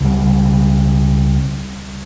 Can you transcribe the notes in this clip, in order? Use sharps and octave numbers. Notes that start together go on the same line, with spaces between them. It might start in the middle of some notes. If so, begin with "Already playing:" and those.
C#2 G3